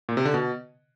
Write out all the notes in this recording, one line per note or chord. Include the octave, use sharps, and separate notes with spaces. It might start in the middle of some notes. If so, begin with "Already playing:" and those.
A#2
C3
D3
B2